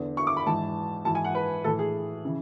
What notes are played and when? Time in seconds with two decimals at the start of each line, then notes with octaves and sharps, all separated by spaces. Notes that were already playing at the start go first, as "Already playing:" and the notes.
Already playing: E2 D3
0.17 C#6
0.27 D6
0.37 B5
0.46 G#2 E3 A5
1.05 G#2 E3 A5
1.15 G#5
1.24 F#5
1.35 B4
1.64 A2 E3 A4
1.79 G#4
2.25 C#3 E3